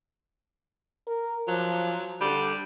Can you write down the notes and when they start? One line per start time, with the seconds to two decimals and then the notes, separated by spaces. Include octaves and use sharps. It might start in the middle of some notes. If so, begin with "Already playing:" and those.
1.07 A#4
1.48 F3 F#3
2.21 D3 G3